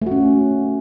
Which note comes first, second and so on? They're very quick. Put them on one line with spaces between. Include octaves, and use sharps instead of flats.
A3 F#4 C#4